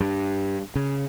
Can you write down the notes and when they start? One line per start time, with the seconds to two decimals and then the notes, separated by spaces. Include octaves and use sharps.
0.01 G2
0.76 C#3